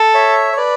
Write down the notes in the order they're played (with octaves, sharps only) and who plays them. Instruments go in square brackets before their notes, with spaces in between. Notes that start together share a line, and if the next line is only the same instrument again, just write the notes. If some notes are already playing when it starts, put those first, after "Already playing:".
Already playing: [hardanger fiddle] A4
[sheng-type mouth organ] C#5 E5
C#5
B4 D5